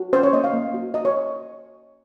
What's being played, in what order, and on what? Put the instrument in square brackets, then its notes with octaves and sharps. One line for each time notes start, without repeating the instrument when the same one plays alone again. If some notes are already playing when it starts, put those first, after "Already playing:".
Already playing: [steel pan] F#4
C#4 C5
C#5
A#3 D#5
F5
A#3
F#4
F#4 D#5
C#5